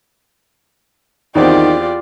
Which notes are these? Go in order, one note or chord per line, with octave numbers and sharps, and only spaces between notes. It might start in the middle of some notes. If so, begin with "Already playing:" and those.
E2 D#3 C4 F4 G4 D5